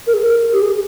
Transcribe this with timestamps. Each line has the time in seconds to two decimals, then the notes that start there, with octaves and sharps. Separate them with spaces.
0.07 A#4
0.14 G#4
0.21 A#4
0.53 G4
0.62 G#4